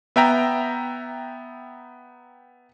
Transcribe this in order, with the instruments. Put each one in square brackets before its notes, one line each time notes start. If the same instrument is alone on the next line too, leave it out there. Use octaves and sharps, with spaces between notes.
[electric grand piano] B3 E5 G5 A#5